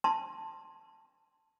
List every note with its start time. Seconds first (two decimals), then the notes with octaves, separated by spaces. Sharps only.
0.04 A5 C6